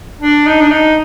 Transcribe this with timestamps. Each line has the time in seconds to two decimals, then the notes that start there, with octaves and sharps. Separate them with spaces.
0.21 D4
0.47 D#4
0.61 D4
0.71 D#4